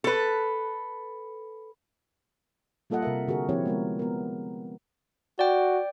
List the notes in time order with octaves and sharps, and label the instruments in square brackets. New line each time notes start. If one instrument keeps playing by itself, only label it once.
[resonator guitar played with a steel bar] A4 B4
[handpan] G3 A#3 F4 A4 D#5 F#5
C3 A#4 E5
D3 F#4 G#4 A#4
F3 C4 E4 G4 C#5
G#3 B3 A#4
B3 A#4
[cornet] F#4 [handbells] D5 G5